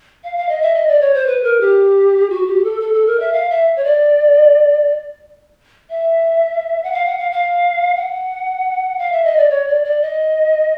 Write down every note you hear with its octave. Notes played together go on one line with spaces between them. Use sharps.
F5
F5
D#5
E5
D#5
D5
C#5
C5
B4
A#4
G4
F#4
G4
A4
A4
A4
A#4
E5
F5
E5
C#5
D5
E5
F#5
F5
F#5
F5
F5
F#5
F5
E5
D#5
D5
C#5
D5
D5
D#5